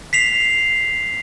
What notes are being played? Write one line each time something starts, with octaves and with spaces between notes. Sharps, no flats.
B6 C7 F7